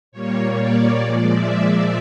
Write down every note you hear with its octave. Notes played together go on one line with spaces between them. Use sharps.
A#2 G3 A#3 C#5
D5
A#2 F3 G#3 D5
E5
E5